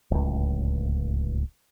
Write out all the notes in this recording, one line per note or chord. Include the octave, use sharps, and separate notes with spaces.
D1 C#2